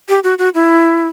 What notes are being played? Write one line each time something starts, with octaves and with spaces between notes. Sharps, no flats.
G4
F#4
F#4
E4